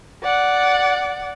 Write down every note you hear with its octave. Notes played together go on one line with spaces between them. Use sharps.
D5 F#5